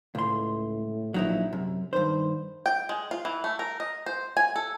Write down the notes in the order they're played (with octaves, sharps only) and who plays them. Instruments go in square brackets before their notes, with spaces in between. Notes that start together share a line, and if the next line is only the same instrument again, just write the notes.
[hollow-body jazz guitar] C#2 C6 [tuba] A2
[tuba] A#1 [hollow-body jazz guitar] F#3 D#4 E4
[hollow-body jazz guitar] F#2 [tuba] C3
[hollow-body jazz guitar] G2 C5 [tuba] D#3
[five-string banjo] G5
G#3
F4
E3
A3
A#4
D#5
C5
G#5
A4